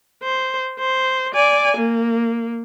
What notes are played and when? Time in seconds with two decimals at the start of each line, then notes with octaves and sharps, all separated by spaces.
0.23 C5
0.79 C5
1.34 D5 G#5
1.77 A#3